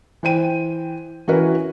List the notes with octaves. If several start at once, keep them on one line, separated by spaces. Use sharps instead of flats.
E3 C5 G5 D#7
E3 C#4 E4 F#4 A#4 B4